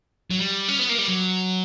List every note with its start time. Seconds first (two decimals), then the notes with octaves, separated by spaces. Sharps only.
0.30 F#3
0.39 G3
0.68 C#4
0.79 B3
0.89 A#3
0.98 G3
1.08 F#3